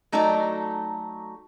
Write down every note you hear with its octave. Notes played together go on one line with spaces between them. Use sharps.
F#3 A3 D#4 F#4 A4 D5